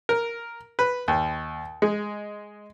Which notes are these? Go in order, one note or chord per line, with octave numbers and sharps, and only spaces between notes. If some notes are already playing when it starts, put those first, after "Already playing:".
A#4
B4
D#2
G#3